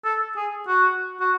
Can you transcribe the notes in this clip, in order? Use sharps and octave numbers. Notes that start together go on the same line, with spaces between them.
A4
G#4
F#4
F#4